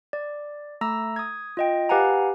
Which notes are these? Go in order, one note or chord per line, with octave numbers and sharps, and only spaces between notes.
D5
A3 A#5 E6 A#6
D#6 G#6
F4 D#5 G5
G4 B4 F5 F#5 G#5 A#5